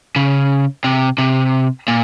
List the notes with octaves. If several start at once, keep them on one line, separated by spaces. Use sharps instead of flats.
C#3
C3
C3
A#2